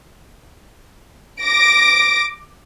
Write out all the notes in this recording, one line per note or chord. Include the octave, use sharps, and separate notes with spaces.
D6 A#6 D7